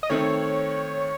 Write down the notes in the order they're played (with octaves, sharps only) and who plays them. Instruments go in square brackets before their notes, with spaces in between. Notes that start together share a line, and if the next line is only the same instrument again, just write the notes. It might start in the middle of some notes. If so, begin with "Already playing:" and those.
[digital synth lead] D#5
[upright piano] D#3 A3 C4 [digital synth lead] C#5